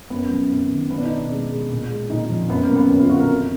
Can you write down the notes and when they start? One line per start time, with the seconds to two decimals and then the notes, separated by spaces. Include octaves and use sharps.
0.10 F#2 B3
0.30 F#3
0.50 F#2 B3
0.71 D#3
0.90 B2 B3
0.98 D4
1.04 D#4
1.10 B2
1.17 D4
1.30 G#3
1.50 G#3
1.69 A#2
1.90 G#3
2.10 A#2 D#4
2.30 F3
2.50 F#2 B3
2.63 A#3
2.69 F#3
2.76 B3
2.90 F#2 B3
2.99 F4
3.10 D3 F#4
3.20 A#4
3.29 F2